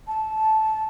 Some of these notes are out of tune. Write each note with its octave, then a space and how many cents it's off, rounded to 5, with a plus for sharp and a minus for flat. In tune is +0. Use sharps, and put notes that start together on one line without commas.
A5 -15